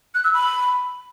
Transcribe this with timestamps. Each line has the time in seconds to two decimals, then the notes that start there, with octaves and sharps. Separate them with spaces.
0.15 F#6
0.24 E6
0.34 B5